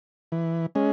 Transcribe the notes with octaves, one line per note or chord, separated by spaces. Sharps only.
E3
G#3 C#4